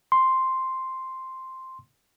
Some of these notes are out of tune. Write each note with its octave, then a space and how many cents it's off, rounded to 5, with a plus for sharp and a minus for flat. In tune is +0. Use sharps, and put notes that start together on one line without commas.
C6 +0